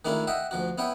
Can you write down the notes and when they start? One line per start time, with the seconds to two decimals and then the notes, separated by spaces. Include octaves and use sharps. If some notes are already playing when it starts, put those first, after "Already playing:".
0.05 D#3 G#3 A3 D4 E4 F4
0.27 D#5 E5 F#5 G5
0.51 D2 F3 F#4
0.78 B3 E4 C#5 G5